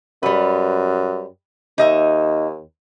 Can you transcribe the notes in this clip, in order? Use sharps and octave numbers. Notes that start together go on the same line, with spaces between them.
F#2 G3 B4
D#2 D#4 D#5 E5